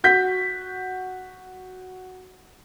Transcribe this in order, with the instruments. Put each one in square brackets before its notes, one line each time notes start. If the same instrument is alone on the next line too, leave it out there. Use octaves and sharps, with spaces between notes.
[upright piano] F#4 G6 B6